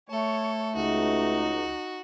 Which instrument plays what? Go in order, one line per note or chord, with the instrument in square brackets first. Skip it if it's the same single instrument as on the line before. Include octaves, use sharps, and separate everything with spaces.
[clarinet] A3 [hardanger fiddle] A4 [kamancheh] C#5
[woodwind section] C#2 [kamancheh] D#4 [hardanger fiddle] F#4